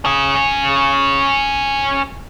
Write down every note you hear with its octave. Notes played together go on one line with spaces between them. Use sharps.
C#4 G#4